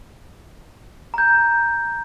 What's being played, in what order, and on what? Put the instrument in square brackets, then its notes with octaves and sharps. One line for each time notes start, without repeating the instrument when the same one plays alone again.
[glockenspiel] A#5 G6